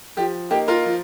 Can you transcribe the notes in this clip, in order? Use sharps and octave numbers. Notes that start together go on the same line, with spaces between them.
F3 G4
A#3 D#4 G4
F4 A#4
F3